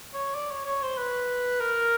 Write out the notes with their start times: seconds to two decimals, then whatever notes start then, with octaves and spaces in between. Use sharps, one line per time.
0.14 C#5
0.35 D5
0.51 C#5
0.66 C#5
0.82 C5
0.98 B4
1.60 A#4